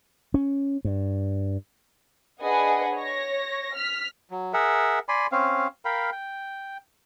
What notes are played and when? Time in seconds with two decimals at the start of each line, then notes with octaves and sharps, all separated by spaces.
0.34 C#4
0.85 G2
2.41 D4 G#4 B4 D#5 F#5 G#5
2.95 C#5 A#6
3.75 F6 B6
4.29 F#3
4.53 G#4 A#4 E5 F#5
5.09 D5 G#5 B5 C6
5.32 C4 C#4 F5
5.85 A#4 F5 G5 B5
6.12 G5